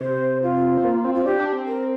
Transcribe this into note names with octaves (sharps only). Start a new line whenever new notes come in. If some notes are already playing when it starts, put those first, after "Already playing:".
C3 C5
F4
C4
A#3
C4
F4
D4 G4
D4
C4
A#4